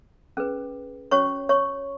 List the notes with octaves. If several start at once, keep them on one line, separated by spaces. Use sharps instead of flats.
C#4 G#4 B4
C#4 F#4 C#5 C#6
C#5 C#6